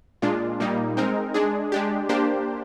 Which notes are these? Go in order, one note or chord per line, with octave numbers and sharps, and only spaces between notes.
A#2 G#3 D4 F4
A#2 G3 A#3 D#4
G#3 C4 D#4 A#4
G#3 D4 G#4
G#3 D4 G4
A#3 D4 G4 C5